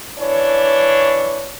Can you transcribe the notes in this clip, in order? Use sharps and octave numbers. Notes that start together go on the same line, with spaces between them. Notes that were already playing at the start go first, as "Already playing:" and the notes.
E3 D4 C#5